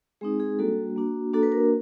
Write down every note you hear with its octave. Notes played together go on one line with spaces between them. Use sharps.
G#3 C4 D#4 G#4
G#4
G3 A#3 D4 F#4 A4
A#3 D4 F#4
A#3 D4 F#4 A4
B4
A#4